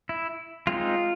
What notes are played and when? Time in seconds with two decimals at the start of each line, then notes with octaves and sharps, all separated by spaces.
0.09 E4
0.67 G#3 C4 D#4 F4